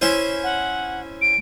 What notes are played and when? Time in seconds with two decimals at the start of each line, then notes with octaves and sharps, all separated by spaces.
0.01 C#4 E4 C5
0.44 F#5
1.22 D7